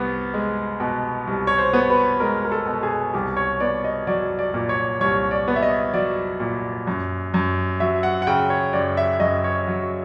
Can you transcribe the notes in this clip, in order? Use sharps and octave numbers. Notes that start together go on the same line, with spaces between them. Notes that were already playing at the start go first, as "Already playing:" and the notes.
Already playing: C2 B3
G#3
B2
C2
C#5
C5
B3
B4
G#3 A#4
A#4
A4
B2
G#4
C2 G4
C#5
B3 D5
D#5
F#3 D5
D5
A#2
C#5
C2 C#5
D5
B3
E5
D#5
F#3 D5
A#2
F#2
F#2
F#3 E5
F#5
F#5
C#3 G5
C#5
F#2 D5
E5
F#2 D#5
C#5
F#3